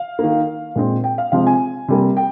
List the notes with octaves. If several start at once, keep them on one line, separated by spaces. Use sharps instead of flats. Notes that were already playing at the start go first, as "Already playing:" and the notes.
Already playing: F5
D#3 A#3
A#2 G#3 C4
G5
F5
C3 F3 G#3 C4 F5
G#5
C3 G3 A#3
G5